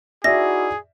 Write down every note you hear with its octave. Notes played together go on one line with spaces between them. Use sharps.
D#4 E4 F#4 G#4 D5 E5 A#6